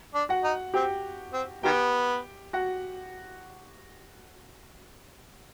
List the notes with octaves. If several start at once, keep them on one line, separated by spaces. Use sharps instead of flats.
D4
F#4 F#5
D#4
C4 G4 G5
C4
D#3 B3 G4 G5
F#4 F#5